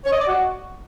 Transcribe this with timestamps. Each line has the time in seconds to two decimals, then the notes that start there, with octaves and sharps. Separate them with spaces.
0.05 C#5
0.12 D#5
0.19 D5
0.26 F#4